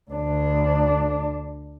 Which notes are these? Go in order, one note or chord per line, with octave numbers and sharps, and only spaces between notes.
D2 D4